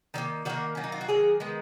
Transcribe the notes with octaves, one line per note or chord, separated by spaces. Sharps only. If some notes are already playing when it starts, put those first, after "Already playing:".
D#3 F#3 A#3
D#3 F#3 A#3 F#4
D#3 F#3 A#3 C#4
D#4
F4
F#4
D#3 F#3 A#3 G#4
D#3 G#3 B3